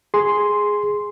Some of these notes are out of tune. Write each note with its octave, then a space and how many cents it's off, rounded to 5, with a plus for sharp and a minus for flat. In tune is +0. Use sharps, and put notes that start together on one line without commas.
G#4 +0 C6 +0